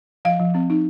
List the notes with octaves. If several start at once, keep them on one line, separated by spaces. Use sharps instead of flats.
F3 F5
F3
C4
D#4